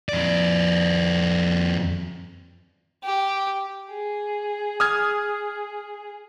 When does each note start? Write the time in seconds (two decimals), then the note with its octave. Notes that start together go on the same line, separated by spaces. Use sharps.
0.09 F2 D5
3.04 G4
3.90 G#4
4.80 D#6 F6 G#6